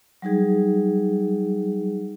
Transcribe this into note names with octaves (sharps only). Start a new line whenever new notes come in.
F#3 G3 D#4 G#4